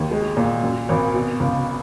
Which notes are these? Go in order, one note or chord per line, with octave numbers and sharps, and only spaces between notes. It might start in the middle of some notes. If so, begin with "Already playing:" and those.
Already playing: D#2 D#3
G#3
A#2
F#2
G#1
B2
C#2